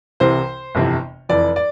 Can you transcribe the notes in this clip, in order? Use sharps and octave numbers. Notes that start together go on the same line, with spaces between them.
C2 C3 E3 C5
G1 F2 C3 E3
F1 F2 E3 D5
D5